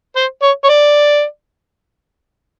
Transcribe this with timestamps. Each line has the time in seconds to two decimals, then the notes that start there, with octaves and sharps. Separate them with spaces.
0.16 C5
0.42 C#5
0.64 C#5
0.69 D5